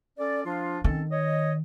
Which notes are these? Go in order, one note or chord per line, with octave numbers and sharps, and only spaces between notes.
C#4 A4 D5
F3 D4 F4
D#3 C4 C#4 A4
C#5 D#5